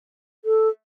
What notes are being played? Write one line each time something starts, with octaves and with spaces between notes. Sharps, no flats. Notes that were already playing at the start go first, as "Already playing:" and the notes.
A4